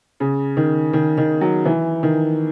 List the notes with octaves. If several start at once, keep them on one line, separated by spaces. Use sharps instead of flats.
C#3
D#3
D#3
D#3
F#3
E3
D#3